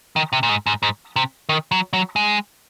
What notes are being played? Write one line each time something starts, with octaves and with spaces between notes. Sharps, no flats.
D#3
C3
A#2
G#2
G#2
G#2
C3
D#3
F#3
F#3
G#3